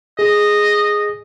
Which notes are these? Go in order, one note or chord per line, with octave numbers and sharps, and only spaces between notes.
G#4 D#5